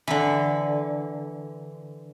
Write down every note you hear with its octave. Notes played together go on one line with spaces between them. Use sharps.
D3 E3